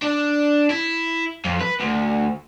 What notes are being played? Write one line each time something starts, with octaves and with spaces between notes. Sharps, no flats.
D4
E4
F2
B4
D2